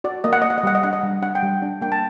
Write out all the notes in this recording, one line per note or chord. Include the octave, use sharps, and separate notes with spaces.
F#4 D5
A#3 D#5
F#5
A#3 D#5
F#5
D#5
G3 F#5
D#5
D4 F#5
D#5
G3
D4 F#5
G5
G3
D4
A#3 G5
A5